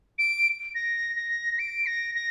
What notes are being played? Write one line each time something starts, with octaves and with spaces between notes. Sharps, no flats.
D7
A#6
A#6
D7
A#6
A#6